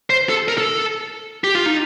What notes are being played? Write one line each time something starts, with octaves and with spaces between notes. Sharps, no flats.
C5
A4
A#4
A4
G4
F4
D#4